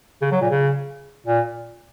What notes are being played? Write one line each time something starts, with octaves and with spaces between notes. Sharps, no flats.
C#3
F#3
A#2
C#3
A#2